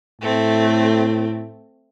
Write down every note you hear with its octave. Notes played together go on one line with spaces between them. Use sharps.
A2 A3 C4